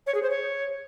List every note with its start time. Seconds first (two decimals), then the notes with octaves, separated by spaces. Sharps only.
0.07 C#5
0.15 G#4
0.23 C5
0.30 C#5